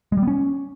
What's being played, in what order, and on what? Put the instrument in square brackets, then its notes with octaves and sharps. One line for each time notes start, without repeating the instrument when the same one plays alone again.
[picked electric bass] G#3
G3
B3
C#4